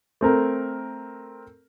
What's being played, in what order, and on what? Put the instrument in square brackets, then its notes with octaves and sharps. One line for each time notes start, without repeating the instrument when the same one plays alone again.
[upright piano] A3 C4 A#4